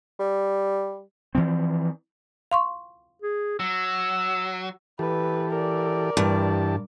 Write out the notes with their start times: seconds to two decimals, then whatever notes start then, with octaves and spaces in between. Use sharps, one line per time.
0.20 G3
1.35 E3 F3 C4
2.51 F5 C6 C#6
3.22 G#4
3.60 F#3 E6
4.99 E3 G4 A4 B4
5.51 A#4 D5
6.17 G2 E3 G4 A5